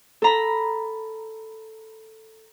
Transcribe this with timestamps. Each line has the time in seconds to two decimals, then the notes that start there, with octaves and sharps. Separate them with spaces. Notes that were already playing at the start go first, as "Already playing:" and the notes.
0.22 A4 A#5 B5